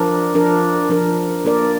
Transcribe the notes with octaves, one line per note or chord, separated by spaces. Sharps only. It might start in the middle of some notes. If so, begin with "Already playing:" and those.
Already playing: F3 D4 A#4
F3 D4 A#4
F3 D4 A#4
A#3 D4 A#4 D5